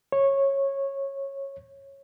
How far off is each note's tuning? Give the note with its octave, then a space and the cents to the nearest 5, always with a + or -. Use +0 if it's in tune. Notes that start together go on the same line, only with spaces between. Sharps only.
C#5 -15